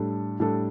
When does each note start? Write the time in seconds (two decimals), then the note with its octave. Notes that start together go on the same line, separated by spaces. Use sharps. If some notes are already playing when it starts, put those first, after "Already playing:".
Already playing: A2 G3 D4 A4
0.40 A2 G3 D4 A4